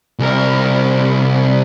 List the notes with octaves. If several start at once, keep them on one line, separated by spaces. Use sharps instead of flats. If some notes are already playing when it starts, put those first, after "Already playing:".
C2 A#4